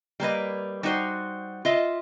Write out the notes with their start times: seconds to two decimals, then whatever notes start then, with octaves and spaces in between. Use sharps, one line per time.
0.20 G3 A#3 B4 D#5
0.83 G3 D#4 F#4 C5
1.65 F4 D#5 E5